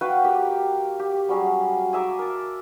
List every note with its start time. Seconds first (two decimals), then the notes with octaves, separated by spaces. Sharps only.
0.01 F#4 B4 F5 G5
0.24 A#3 G4 G5
0.99 G4
1.29 F#3 G3 C#4 G#4
1.93 G#4 E5 A#5 D6
2.19 A#4 A5